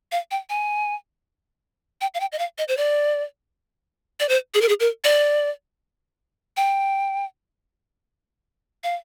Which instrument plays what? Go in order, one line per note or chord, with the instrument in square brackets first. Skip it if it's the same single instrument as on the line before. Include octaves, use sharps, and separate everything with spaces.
[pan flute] F5
G5
G#5
G5
F5
G5
D#5
F5
D#5
C5
D5
D5
C5
G#4
A#4
G#4
A#4
D5
G5
F5